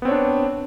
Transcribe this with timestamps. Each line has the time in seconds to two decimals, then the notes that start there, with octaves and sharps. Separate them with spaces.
0.02 B3
0.05 C4
0.08 C#5
0.11 D4